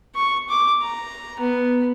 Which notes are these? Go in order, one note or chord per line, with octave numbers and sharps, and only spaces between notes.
C#6
D6
A#5
B3